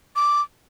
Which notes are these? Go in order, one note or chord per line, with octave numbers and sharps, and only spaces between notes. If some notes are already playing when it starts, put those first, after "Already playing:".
D6